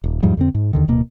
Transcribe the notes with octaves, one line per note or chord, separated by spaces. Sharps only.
D#1
E2 G#2 F3 G3
F2 D3 C4
G#2
D#2 D3 D#3
D1 B2 A#3